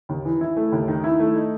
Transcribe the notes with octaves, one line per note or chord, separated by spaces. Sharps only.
D#2
E3
E4
A3
D#2
D#3
E4
A3
D#4